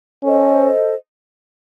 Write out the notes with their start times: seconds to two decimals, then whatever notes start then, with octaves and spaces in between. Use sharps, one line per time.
0.23 C#4 A4 C5 D#5